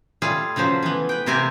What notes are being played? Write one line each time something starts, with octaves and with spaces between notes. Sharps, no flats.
G3 A3 F4 G#4
C#3 F3 F#3 C5
E3 B3
B4 G5
C3 A#3 C4 G4 A#4 G#5